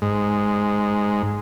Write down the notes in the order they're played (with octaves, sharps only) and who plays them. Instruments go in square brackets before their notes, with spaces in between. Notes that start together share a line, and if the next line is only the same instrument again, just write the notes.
[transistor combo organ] G#2